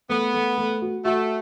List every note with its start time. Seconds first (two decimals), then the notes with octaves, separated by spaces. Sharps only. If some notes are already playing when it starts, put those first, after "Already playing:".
0.09 A3 B3
0.34 A3
0.58 A3
0.82 F#4
1.05 A3 F#4